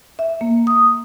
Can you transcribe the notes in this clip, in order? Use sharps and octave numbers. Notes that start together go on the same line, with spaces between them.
E5
A#3
D#6